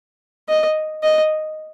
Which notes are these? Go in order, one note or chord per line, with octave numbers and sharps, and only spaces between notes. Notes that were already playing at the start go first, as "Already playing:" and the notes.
D#5
D#5